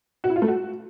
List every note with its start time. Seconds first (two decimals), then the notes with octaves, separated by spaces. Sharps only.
0.24 F#4
0.30 E4
0.36 F4
0.42 A3
0.48 F#4